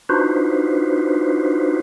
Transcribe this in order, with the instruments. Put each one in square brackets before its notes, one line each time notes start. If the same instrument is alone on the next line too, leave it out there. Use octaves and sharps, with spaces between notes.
[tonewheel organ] D4 D#4 F4 F#4 B4 C5